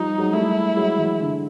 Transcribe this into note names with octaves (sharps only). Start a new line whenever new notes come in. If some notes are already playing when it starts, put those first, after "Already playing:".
Already playing: F3 G3 D#4
F#3 G#3
G3 A3 E4
F#3 G#3
E3 F#3
D3